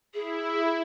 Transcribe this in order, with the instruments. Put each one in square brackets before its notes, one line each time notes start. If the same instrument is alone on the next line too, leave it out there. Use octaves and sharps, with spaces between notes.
[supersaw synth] E4 [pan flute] G#4